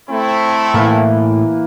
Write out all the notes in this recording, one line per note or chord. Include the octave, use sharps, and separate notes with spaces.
A3 C4 E4
A2 E3 A#3